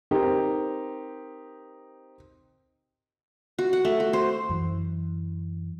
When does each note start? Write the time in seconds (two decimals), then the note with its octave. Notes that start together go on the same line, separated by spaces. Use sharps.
0.11 C4 D#4 G4 A#4
3.59 F#4
3.73 F#5
3.85 A3
4.00 F#4
4.13 C5
4.49 F#2 E3